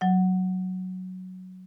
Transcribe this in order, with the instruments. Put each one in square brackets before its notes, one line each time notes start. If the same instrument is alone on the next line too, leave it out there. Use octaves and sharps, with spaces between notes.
[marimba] F#3 F#5